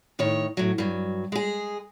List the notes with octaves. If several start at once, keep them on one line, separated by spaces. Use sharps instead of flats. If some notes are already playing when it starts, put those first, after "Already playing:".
A2 D#3 C#5
A2 F#3
G2 F#3
G#3 G#4